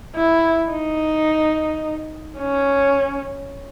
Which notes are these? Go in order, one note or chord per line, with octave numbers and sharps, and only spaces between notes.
E4
D#4
C#4